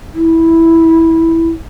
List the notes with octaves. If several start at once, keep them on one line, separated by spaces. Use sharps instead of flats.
E4